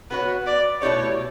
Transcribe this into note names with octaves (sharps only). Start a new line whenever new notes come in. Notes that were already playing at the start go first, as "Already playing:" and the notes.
B3 F#4 B4 C#5
D5
B2 A3 E4 G4 C#5 D5